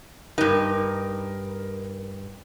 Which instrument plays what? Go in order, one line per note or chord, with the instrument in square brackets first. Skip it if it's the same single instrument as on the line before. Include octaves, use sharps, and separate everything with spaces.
[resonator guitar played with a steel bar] G2 D#4 [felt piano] A#4